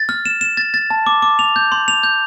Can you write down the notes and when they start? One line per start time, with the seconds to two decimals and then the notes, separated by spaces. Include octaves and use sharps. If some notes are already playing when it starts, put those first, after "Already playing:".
Already playing: A6
0.09 F6
0.26 E7
0.41 E7
0.57 A6
0.74 A6
0.90 A5
1.07 D6
1.22 D6
1.39 F7
1.56 G6
1.72 C6
1.88 F7
2.03 G6